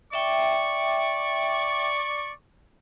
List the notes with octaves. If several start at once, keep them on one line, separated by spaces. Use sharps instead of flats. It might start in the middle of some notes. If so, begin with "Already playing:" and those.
D5 E5 G5 C#6